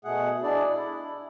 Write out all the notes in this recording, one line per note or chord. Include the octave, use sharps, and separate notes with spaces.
B2 A3 G#4 F#5
D4 E4 G#4 D5
E4